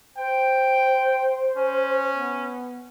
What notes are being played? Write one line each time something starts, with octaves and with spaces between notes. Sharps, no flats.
C5 G5
C#4
B3